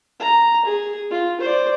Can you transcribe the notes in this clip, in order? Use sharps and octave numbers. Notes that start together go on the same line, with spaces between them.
A#5
G#4
F4
C5 D5